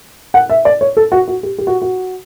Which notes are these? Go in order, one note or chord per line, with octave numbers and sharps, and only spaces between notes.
F#5
E5
D5
C#5
A4
F#4
F#4
G4
G4
F#4
F#4